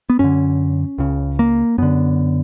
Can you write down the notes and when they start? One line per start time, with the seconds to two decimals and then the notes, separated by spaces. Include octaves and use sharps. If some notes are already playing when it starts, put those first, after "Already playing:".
0.10 B3
0.19 F#2 D3 C#4
0.98 C#2 C#3
1.39 A#3
1.78 F#2 D3 B3